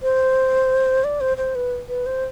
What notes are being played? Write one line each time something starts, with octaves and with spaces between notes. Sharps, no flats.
C5
D5
C5
C5
B4
B4
C5